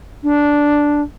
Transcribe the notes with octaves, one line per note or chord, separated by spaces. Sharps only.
D4